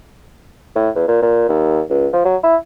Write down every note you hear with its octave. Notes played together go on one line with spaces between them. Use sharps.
A2
E2
A#2
A#2
D#2
C#2
F3
F#3
E4